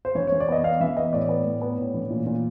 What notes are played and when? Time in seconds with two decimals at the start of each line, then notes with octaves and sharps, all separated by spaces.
0.05 C5
0.15 E3 C#5
0.27 E3 C#5
0.40 D5
0.48 B3 D#5
0.64 B3 F5
0.80 E3 E5
0.97 B3 D#5
1.13 A2 D5
1.29 B3
1.45 A2
1.62 B3
1.78 A2
1.94 E3
2.10 A#2
2.26 A#2